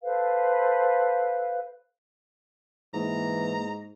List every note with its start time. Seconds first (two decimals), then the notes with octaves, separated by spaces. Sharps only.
0.02 A4 B4 C5 F5
2.94 G#2 E3 A#3 A#5